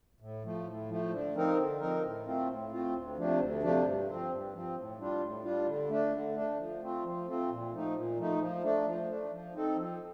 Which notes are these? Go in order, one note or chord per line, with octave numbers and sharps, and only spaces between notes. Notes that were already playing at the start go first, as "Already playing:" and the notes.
A2
F3 A3
A2
F3 A3
D3
F3 C4 D#4 A#4
D3
F3 C4 D#4 A#4
A2
A3 C4 F4
A2
A3 C4 F4
D2
C3 F3 A3 D4
D2
C3 F3 A3 D4
G2
F3 C4
G2
F3 C4
A2
G3 D4 F4
A2
G3 D4 F4
D3
A3 D4
D3
A3 D4
F3
A3 C4 F4
F3
A3 C4 F4
A#2
F3 A3 D#4
A#2
F3 A3 D#4
F3
A3 D4
F3
A3 D4
F3
C4 D#4 A4
F3